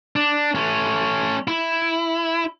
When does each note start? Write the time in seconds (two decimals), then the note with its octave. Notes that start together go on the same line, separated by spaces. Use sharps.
0.16 D4
0.55 A3 C#4
1.48 E4